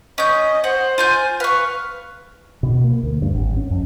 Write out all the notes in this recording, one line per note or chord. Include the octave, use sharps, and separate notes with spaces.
C#4 D#5 G6
C5 F#5
F4 G#5 G6
B4 F5 C#6
B2
A#3
D2
G2
G#1
C#4
F2